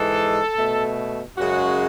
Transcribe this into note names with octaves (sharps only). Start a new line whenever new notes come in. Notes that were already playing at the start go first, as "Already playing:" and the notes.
Already playing: G#2 E3 G#3 A4
B2 A3
F#2 C#3 G#3 F#4